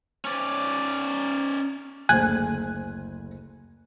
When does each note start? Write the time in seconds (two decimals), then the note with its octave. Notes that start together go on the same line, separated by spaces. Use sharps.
0.25 C#4 D5
2.09 F#1 D2 C5 G#5 F#6 G#6